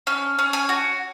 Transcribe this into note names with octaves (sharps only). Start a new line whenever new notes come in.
C#4
C#4
G#5
F#4